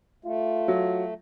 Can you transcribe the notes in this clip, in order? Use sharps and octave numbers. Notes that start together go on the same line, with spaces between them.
A3 F4
F#3